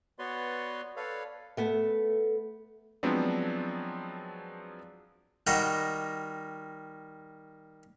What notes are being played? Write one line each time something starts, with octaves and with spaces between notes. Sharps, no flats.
B3 F#4 B4 C#5 D5 C6
A4 B4 C#5 D5 F5
A3 B3 A4
F3 F#3 G#3 B3 C4 D4
D#3 G3 F#4 D#5 G5